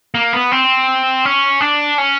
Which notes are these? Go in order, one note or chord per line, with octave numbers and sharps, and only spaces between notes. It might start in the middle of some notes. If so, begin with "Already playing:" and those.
A#3
B3
C4
C#4
D4
C#4